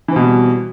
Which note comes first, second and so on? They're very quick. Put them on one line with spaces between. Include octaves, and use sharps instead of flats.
E3 C4 B2 G3